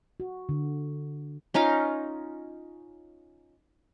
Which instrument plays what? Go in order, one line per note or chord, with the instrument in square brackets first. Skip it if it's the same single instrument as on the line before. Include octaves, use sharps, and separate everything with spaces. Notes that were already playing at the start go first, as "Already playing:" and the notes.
[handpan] F#4
D3
[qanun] C#4 D#4 F4 F5